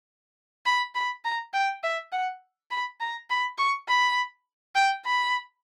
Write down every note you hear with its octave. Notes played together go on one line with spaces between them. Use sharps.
B5
B5
A#5
G5
E5
F#5
B5
A#5
B5
C#6
B5
G5
B5